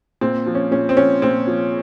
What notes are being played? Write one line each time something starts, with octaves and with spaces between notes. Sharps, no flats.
A#2 C4
F3
C#4
A#2 C#4
C4
F3 C#4
A#2 C4
F3